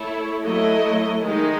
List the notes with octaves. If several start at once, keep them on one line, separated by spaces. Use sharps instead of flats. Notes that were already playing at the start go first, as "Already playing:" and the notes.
Already playing: A3 E4 A4 C#5
F#3 A3 E4 A4 D#5
D#3 G#3 D#4